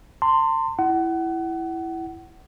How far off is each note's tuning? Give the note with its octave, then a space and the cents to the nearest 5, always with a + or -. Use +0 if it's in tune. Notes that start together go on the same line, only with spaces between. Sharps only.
A5 +45 C6 +0
E4 +5 F#5 +30